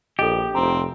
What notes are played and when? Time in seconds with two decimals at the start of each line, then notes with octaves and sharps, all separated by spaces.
0.19 A#1 G4 A4 D#5
0.55 F1 C4 A#5